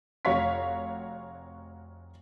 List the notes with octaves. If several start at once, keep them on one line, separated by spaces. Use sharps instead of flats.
F1 F#4 C#5 F5 C#6 B6